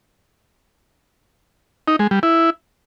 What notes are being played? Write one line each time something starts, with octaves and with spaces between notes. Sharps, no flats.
D#4
G#3
G3
E4